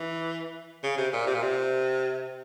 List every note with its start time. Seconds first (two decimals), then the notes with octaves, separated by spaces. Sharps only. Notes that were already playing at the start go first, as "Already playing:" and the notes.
Already playing: E3
0.83 C#3
0.97 C3
1.13 A#2
1.26 C3
1.34 A#2
1.42 C3